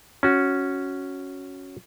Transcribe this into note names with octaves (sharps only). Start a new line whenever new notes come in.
C#4 F#4